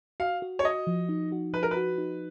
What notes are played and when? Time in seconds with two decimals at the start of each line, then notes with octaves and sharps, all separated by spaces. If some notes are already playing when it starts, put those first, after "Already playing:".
0.20 F#4 F5
0.42 F#4
0.59 C#5
0.64 F#4 D#5
0.87 F3
1.09 D#4
1.32 F#4
1.53 F3 B4
1.63 A#4
1.71 B4
1.76 F#4
1.98 D#4